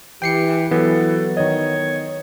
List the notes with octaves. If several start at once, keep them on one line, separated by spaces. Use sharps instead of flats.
E3 G4 G5 C7 C#7
E3 F#3 B3 A4
D#3 C#5 D#5